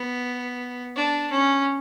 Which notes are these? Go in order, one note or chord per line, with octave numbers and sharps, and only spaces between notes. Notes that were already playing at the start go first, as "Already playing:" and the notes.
Already playing: B3
D4
C#4